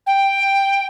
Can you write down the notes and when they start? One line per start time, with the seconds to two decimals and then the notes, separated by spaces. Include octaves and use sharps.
0.06 G5